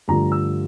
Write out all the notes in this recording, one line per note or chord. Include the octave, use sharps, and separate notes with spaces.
G2 D3 F3 A3 A#5
E6